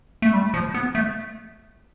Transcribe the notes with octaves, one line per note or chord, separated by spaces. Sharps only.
A3
G3
F3
B3
A3